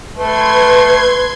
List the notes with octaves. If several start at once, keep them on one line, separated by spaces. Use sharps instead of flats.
A3 B4 C6 G#6